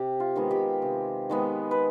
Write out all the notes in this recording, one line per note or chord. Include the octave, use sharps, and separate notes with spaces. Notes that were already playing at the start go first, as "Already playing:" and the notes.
Already playing: C3 G4
F4
D#3 G#3 B3
G4
C3
D#3 G#3 B3
B4